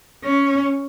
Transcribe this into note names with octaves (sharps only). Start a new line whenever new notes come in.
C#4